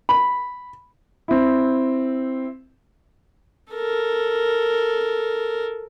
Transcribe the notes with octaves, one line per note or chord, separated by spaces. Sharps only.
B5
C4 E4
A4 A#4